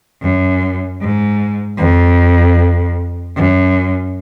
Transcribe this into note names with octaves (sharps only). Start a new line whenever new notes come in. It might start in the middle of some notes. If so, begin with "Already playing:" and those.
F#2
G#2
F2
F#2